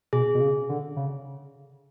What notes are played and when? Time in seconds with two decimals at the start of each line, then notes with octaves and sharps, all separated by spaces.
0.13 B2 G#4
0.34 B2
0.40 C#3
0.69 D3
0.96 C#3